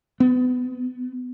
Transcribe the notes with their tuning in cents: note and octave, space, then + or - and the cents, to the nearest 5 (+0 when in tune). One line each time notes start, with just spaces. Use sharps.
B3 +25